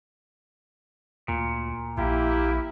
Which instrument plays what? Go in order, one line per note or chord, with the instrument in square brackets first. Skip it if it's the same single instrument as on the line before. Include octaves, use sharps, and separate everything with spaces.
[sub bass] D2 [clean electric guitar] A#2
[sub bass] A#1 [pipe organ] A#3 G4 G5 [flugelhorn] E4